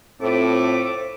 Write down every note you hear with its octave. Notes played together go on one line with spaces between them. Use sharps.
A2 A3 C4 F4 A4 C5 D6